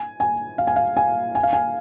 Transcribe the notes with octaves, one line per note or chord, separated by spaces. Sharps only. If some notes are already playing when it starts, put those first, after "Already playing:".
Already playing: G#5
G#5
F5
G#5
F5
G#5
G#5
F5
G#5